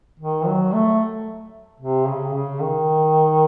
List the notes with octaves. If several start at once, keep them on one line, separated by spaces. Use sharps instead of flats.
D#3
F#3
A3
C3
C#3
C#3
D#3